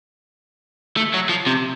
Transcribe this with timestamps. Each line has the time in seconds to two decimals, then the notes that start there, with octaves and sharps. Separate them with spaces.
0.97 A3
1.14 F#3
1.29 F3
1.47 C3